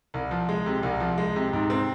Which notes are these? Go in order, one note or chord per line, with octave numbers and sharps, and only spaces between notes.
C2
F3
G#3
C3
C2
F3
G#3
C3
G#2
C4